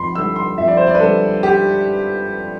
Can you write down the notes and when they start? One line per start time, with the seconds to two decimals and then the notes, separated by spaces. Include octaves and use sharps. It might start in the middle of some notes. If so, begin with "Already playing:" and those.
Already playing: F2 B5 C6
0.15 D3 G3 E6
0.36 C6
0.57 F2 E5
0.68 D5
0.77 C5
0.87 D5
0.95 B4
1.00 D3 G3 A4
1.43 G4